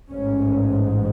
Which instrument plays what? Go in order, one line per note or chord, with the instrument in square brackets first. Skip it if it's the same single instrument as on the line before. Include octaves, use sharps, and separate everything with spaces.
[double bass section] A1 G#2 C#4